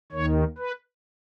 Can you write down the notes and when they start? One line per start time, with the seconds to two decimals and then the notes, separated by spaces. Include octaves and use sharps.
0.12 D#2 D#3 C#5
0.58 B4